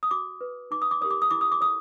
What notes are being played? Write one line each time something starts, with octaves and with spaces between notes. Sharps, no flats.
D#6
F#4 D6
B4
D#4 D6
D#6
D6
G4 A#4 C#5 D#6
D6
D#6
E4 D6
D#6
D6
A4 C#5 D#6